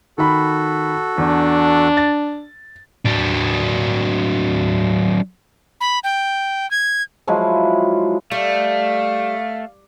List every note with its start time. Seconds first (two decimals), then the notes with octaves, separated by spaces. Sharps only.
0.18 D#3 F#4 A4 B5
1.18 E2 D4
1.97 A6
3.05 F#3 D4
5.81 B5
6.04 G5
6.71 G#6
7.27 F3 F#3 G#3 E4
8.32 G3 A3 F5